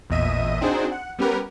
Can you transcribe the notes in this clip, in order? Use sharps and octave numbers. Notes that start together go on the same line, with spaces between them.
A1 E2 A#2 D#5 E5 D#7
C4 D4 D#4 F#4 G#4 C5
F#5
G3 B3 C#4 G4 A#4 B4